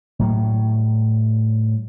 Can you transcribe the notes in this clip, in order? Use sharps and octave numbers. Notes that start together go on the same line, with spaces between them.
A2 F#3 G3